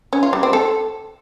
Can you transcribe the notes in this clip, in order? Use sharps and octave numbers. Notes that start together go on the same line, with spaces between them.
C#4
F4
G3
C4
A4